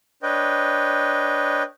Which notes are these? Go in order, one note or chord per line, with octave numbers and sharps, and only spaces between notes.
D4 B4 C#5 D#5 G5